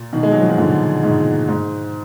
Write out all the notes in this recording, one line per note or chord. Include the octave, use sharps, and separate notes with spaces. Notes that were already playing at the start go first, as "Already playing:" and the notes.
Already playing: A#2
B2 D#3
G#3
F#3
F3
D#3
A#2 D3
G#2 B2
G#2